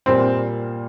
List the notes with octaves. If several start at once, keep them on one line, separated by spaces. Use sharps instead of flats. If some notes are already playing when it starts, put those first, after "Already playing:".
A#2 G3 A#3 C4